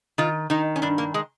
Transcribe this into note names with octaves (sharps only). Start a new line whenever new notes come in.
D#3 F4
D#3 D#4
C#4
G2 D4
A#3
G#3